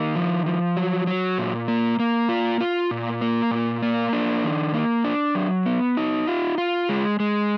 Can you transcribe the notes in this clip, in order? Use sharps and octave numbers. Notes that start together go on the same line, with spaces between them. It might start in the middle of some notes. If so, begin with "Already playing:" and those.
Already playing: D#3 A#3
F3
F3
F#3
F#3
A#2
A#3
A#3
F4
F4
A#2
A#3
A#2
A#3
D4
D#3
A#3
D4
F#3
B3
D#4
F4
F4
G#3
G#3